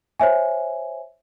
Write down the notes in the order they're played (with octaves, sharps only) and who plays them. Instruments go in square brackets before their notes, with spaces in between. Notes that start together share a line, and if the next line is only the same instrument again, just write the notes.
[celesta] C5 C#5 E5 G#5